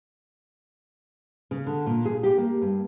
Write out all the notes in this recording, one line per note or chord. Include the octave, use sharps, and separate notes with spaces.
C#3
D3
A#2
G#4
G4
A#3
G2